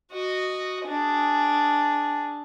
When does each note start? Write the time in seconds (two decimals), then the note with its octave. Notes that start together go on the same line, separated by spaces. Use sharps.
0.12 F#4 D#5
0.86 D4 G#4